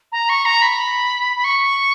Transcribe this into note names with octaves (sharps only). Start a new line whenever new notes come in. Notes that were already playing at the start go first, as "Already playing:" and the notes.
A#5
C#6
A#5
B5
B5
C#6